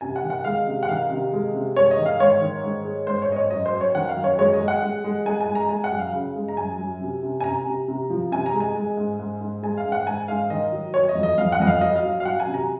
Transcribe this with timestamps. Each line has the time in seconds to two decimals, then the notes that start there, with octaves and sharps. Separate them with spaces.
0.01 C3 G#5
0.16 F#5
0.23 D#3
0.30 F#5
0.44 G#3 F5
0.67 C3
0.83 F#5
0.88 D#3 F5
1.10 C3
1.33 G#3
1.54 C3
1.76 G#3 C#5
1.91 D#5
1.98 D#3
2.06 F5
2.20 G#2 C#5
2.42 D#3
2.64 G#2
2.85 G#3
3.07 G#2 C5
3.22 C#5
3.29 G#2 D#5
3.36 C#5
3.50 F#2 D#5
3.66 C5
3.73 F#2
3.81 C#5
3.95 D#3 F#5
4.09 F5
4.17 F#2
4.24 C#5
4.38 G#3 C#5
4.54 D#5
4.60 G#3
4.68 F#5
4.82 G#3
5.04 G#3
5.26 G#3 G#5
5.40 G#5
5.47 G#3
5.55 A#5
5.69 G#3 G#5
5.84 F#5
5.91 F#2
5.99 F5
6.13 C#3
6.36 G#3
6.48 A#5
6.57 F#2 G#5
6.79 F#2
7.01 C3
7.23 C3
7.40 G#5
7.44 C3 A#5
7.67 C3
7.88 C3
8.10 F3
8.32 C3 G#5
8.46 A#5
8.53 G#3
8.60 G#5
8.75 G#3
8.97 G#2
9.20 G#2
9.41 G#2
9.63 G#3 G#5
9.77 F5
9.85 G#2
9.92 F#5
10.07 G#2 G#5
10.28 G#2 F5
10.50 D#3 D#5
10.72 F#3
10.94 F#3 C#5
11.09 D#5
11.15 F2
11.23 D#5
11.38 F2 F5
11.52 F#5
11.60 F2 D#5
11.67 F5
11.81 F#3 D#5
11.96 F5
12.03 F#3
12.20 F5
12.25 F#3 F#5
12.40 G#5
12.47 C3
12.54 A#5